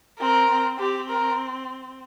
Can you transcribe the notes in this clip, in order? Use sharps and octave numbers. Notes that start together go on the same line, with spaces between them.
C4 A#4
C4
C4 G4
A#4